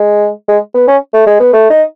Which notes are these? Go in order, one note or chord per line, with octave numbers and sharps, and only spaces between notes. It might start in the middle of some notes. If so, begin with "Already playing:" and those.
Already playing: G#3
G#3
B3
C#4
A3
G#3
B3
A3
D#4